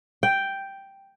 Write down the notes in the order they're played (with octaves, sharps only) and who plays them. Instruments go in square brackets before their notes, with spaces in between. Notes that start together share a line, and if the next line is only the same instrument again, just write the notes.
[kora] G5